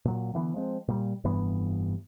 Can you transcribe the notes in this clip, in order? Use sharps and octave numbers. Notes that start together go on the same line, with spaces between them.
A#2 F#3
D3 E3 G3 B3
F3 G#3 C4
A#2 G3
F1 G2 E3 B3